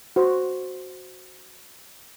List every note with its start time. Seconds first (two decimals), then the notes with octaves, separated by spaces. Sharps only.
0.16 F#4 C5